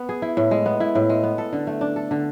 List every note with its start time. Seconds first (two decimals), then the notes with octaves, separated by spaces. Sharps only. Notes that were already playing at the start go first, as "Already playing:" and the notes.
Already playing: B3
0.09 G#4
0.22 E4
0.37 A2
0.51 G#3
0.66 B3
0.80 E4
0.95 A2
1.09 G#3
1.23 B3
1.38 A4
1.53 D3
1.67 A3
1.81 D4
1.96 A4
2.11 D3